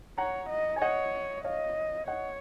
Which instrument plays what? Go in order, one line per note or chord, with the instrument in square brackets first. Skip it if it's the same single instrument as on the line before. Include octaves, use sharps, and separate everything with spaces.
[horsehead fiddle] C#5 [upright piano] F#5 A#5
[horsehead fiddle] D#5
[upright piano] G#5
[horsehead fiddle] C#5 [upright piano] D#5 F#5
[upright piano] C#5 F5 [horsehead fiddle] D#5
[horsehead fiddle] C#5 [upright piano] D#5 F#5